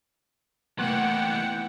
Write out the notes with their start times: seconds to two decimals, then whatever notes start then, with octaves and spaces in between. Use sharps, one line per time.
0.79 E2 C3 E3 A3 A#3 F#5 G5